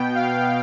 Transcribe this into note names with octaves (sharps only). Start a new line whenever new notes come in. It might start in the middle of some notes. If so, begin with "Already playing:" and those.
Already playing: B2 B3 G5
F5